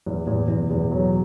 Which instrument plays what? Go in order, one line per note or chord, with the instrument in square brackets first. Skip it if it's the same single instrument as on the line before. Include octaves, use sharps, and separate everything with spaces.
[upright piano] E2 [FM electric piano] G2
[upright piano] E2 [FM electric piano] A2
[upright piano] E2 [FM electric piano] B2
[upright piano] E2
F#3